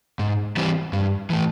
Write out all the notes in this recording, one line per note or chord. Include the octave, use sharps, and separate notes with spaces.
G#2
E3 G3 C4
G2
E3 A3